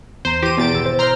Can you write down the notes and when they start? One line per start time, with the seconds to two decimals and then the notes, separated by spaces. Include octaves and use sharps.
0.25 E2 C5 A#5
0.42 E3 G4 C6 A#6 D#7
0.58 E2 B2 A6 D7
0.73 G#1 E6
0.86 C5
0.99 C5 A#5 C6 F6 G6